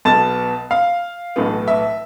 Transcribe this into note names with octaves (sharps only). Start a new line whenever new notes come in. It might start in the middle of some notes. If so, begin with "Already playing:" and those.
B1 B2 B3 A5
F5
B1 A2 E3 B3
E5